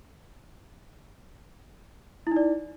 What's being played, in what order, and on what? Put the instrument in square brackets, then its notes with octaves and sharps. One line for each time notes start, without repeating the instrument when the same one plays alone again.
[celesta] E4
D#4
D5